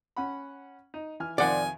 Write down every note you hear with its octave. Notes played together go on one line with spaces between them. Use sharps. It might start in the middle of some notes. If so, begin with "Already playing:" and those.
C#4 F#5 B5
D#4
E3 G#5 F6
F2 C3 D#3 D5 F#5 G#5